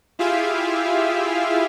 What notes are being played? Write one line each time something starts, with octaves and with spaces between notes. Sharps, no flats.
E4 F4 G4 G#4 E5 F5